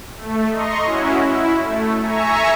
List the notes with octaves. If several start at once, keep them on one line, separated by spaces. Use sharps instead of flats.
A3
D#5 A#5 C6 C#6
C#4 E4 F#4
E4
A3
E5 G#5 A#5 C#6